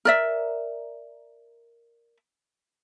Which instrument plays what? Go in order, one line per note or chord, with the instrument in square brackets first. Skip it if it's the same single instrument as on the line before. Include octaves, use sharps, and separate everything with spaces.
[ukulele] A#4 D5 E5